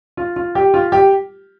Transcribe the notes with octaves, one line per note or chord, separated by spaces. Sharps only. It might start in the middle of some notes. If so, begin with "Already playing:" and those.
F4
F4
G4
F4
G4